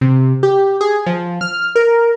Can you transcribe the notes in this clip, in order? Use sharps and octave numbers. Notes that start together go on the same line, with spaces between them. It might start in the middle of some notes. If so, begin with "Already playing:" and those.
C3
G4
G#4
F3
F6
A#4